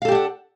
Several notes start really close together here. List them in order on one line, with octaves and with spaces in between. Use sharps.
F5 A4 G4 D4 F#5